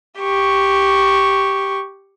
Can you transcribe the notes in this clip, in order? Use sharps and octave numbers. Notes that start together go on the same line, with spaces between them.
G4 C#6